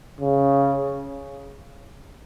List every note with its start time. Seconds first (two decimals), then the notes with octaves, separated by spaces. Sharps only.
0.20 C#3